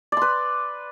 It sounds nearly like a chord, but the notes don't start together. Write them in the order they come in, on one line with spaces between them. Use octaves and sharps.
D5 C6 B4